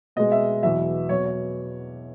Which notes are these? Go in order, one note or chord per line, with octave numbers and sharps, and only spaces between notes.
B2 G#3 D#5
E5
E2 B2 F#3 E5
B2 F#3 C#5
C#5